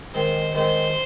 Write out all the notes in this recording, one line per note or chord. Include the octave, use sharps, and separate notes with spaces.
D#3 G#3 C4 C5
D#3 G#3 C4 C5